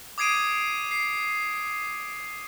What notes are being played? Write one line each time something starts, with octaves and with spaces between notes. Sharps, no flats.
D6 D#6 G#6 C7 D7 D#7
C7